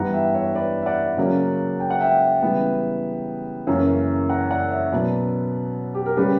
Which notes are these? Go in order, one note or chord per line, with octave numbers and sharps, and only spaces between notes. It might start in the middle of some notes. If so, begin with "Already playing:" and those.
Already playing: G2 E3 G3 B3 F#5 A#5
E5 G5
C#5 E5
B4 D5
E5
D5 F#5
C#3 F#3 A#3 C#4
G5
F#5
E5 G5
C#3 E3 G3 B3
F#2 C#3 E3 A#3 C#4
F#5 A#5
D5 F#5
C#5 E5
B2 F#3 B3 B4 D5
G4
A#4
C#3 G3 C#4 G4 B4